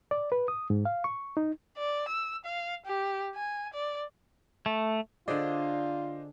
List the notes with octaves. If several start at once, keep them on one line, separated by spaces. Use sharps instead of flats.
D5
B4
D#6
G#2
F5
C#6
D#4
D5
E6
F5
G4
G#5
D5
A3
D3 D4 F4 G#4 C5 D5 D#5